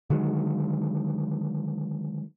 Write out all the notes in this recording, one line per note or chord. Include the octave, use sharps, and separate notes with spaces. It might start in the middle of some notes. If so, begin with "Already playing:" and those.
D3 D#3 F#3 G#3